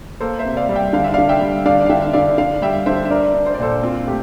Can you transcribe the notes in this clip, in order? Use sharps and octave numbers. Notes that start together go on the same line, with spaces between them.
A#3 A4 C5
C5 E5
C3
D5 F5
G3
E5 G5
D3 F5
E5
D3 D5 F5
E5 G5
G3
D3 D5 F5
F5
D3 E5 G5
E5
D3 D5 F5
D3 D5 F5
G3 E5 G5
D3 C5 E5
E5
D4 A#4 D5
D4
C5
D5
A#2 A4 C5
C4 F4
A3 G4